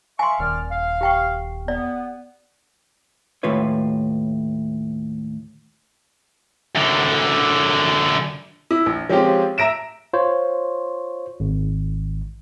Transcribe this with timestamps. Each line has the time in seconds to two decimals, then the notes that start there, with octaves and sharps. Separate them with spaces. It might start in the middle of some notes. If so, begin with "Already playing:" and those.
0.19 E5 F5 G#5 C6 C#6
0.40 D#1 D#3 D5 F6
0.71 F5
1.01 G4 G5 C#6
1.68 B3 D5
3.43 D#2 A2 F4 B4 C#5
6.76 F#2 D3
8.71 E4
8.86 A#1
9.09 F3 G#3 C4 C#4 F4 G4
9.58 E5 A#5 A#6 D7 E7
10.13 F4 C5 C#5
11.40 G#1